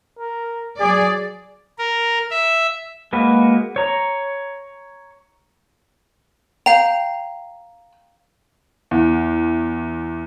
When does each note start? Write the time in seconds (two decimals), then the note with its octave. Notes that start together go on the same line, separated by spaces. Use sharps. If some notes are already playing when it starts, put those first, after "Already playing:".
0.19 A#4
0.80 F#3 G#4 D5
1.79 A#4
2.31 E5
3.13 G#3 A#3 F#4 B4
3.76 C#5 A#5
6.66 F5 G5 A#5
8.91 E2